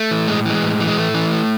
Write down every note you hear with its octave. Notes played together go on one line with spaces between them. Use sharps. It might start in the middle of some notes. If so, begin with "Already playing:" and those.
Already playing: A3
E3
A2 G#3
E3 G#3
A2
E3
G#3
A2 A3
E3
A2